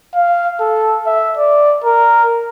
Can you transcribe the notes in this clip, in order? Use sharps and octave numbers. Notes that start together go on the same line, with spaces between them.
F5
A4
E5
D5
A#4